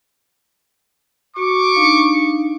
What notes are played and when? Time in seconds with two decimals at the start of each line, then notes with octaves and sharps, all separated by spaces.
1.37 F#4 C#6 D6
1.76 D4 D#4 F5